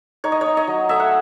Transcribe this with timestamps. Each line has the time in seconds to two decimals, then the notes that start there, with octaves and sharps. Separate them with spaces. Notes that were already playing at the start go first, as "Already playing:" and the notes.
0.24 D#4 C#5
0.32 D#5
0.41 C#5
0.46 D#4
0.57 D#5
0.68 F#3
0.89 A3 E5
1.00 F#5